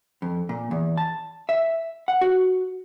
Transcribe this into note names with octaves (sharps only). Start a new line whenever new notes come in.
F2
A#2
E2
A5
E5
F#5
F#4